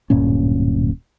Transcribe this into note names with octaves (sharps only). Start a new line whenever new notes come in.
D1 G2 A#2 C#4